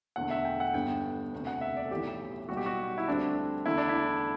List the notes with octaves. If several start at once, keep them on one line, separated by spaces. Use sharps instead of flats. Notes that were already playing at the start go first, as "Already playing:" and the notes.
E1 E2 D3 A3 F#5
E5
G5
F#5
G1 G2 D3 G3 B3 G5
E1 D2 C3
F#5
E5
D5
A4
B1 A2 E3 G4
B1 B2 G3 F#4
G4
F#4
E4
D2 D3 G3 C4 D4
E2 D3 A3 E4
D4
E4